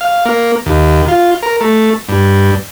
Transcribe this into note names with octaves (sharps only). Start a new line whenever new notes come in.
F5
A#3
D#2
F4
A#4
A3
G2